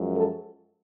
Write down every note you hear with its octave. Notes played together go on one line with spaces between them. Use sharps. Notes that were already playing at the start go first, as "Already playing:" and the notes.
Already playing: F#2 F3 G#3
A4